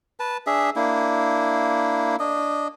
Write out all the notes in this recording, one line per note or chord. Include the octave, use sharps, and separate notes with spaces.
B4 A5
D4 G#4 E5
A#3 D4 E4
D4 D#5